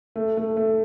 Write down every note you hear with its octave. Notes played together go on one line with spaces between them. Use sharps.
A3
A3
A3